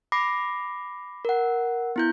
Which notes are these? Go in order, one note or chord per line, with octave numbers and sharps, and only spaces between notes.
B5 D6 A#6 C7
A#4 F#5
B3 E4 G6